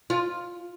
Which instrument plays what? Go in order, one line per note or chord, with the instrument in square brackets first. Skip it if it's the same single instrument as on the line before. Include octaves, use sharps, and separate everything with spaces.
[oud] F4